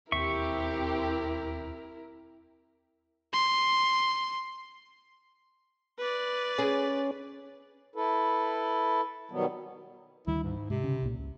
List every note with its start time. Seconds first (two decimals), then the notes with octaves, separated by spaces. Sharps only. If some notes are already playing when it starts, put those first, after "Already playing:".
0.12 E1 D#2 C4 E4 G4 A#4 E5 C#6
3.33 C6
5.98 B4 D5
6.58 C#4 G#4
7.96 E4 A4 B4
9.31 B2 D#3 F#3 G3 B3
10.27 D2 D#3 G3 E4
10.44 G#2
10.70 G#2 C3
10.84 C#3
11.02 B1 A#2
11.19 C#2